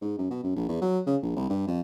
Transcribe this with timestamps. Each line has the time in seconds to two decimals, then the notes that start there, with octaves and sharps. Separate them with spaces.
0.01 G#2
0.18 F#2
0.30 B2
0.43 F#2
0.56 A#1
0.69 E2
0.81 F#3
1.06 C#3
1.22 A#1
1.36 C2
1.50 G2
1.67 F2